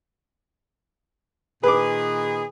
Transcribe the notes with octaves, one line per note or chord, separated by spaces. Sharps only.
A#2 D#3 G#4 B4 D6